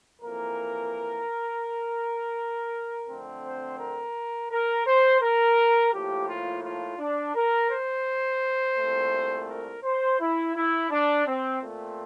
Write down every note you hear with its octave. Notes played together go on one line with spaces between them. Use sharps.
F2 E3 A#3 A#4
F2 D3 A3 C4
C5
A#4
A#4
C5
A#4
A2 F3 A#3 G4
F4
F4
D4
A#4
C5
C2 A#2 A3 C4
A#4
C5
E4
E4
D4
C4
A#2 A3 C4